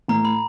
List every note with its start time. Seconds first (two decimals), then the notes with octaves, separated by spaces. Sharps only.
0.08 A2 A#5
0.25 B5